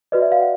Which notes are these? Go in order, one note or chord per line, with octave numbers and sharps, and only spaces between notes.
F#4 B4 D5 D#5
E5
F5
F#5